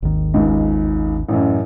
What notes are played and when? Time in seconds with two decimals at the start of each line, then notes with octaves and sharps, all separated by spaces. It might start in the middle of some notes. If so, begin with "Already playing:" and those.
0.02 G#1 D#2 D#3
0.34 C#2 G#2
1.29 A1 F#2